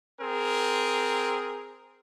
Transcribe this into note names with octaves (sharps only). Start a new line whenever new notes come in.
C4 G#4 A#4